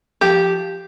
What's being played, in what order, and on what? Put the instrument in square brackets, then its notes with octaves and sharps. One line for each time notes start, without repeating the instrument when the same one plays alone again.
[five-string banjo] F3 G4